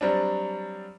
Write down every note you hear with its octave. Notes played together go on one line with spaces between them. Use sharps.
F#3 G3 C4 D4